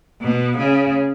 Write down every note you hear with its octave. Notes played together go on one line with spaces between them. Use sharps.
B2
C#3